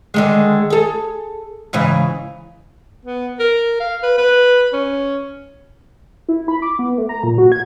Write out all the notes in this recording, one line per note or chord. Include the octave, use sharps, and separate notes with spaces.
D3 D#3 G#3
G#4 A4
G#2 C#3 E3
B3
A#4
F5
B4
B4
C#4
E4
B5
D6
B3
A3
A#5
A#2
F#4
G#6